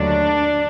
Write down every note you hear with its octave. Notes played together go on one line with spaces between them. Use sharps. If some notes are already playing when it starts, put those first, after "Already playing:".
Already playing: D#2 D3 F#3 A3 D4